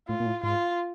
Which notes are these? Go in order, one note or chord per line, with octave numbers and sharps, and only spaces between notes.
A2 F4
A#2
A2
G#2 F4